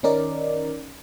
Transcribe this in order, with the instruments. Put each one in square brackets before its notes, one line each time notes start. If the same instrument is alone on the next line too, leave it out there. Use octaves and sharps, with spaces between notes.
[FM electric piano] D#3 C#4 D#4 A#4 D5